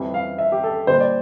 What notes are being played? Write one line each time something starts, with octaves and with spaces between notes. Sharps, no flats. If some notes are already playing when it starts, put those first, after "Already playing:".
Already playing: F2 E3 G3
F5
E5
G4
A4
A#2 G3 C5
D5